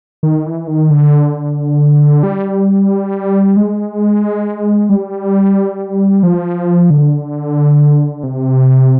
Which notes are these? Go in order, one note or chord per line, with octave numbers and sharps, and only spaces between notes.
D#3
E3
D#3
D3
G3
G#3
G3
F3
D3
C3